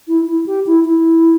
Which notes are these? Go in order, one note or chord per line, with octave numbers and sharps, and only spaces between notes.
E4
E4
G4
E4
E4